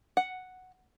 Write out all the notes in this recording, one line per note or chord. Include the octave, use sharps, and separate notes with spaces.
F#5